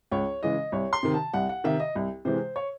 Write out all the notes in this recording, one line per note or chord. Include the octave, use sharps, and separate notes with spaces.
C#2 C#5
C#3 E3 G#3 D#5
C2 C#5
C6
C3 D#3
A5
C2 F#5
F#5
C3 D#3 E5
D#5
C2
C3 E3 G#3 C5
C#5